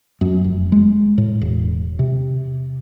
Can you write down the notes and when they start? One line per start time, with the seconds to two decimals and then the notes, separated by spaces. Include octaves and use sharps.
0.21 F#2
0.44 F1
0.72 G#3
1.18 A2
1.42 E1
1.99 C3